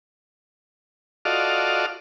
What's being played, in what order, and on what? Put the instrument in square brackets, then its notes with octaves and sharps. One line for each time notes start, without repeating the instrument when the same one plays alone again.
[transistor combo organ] F4 F#4 A4 D5 D#5 F5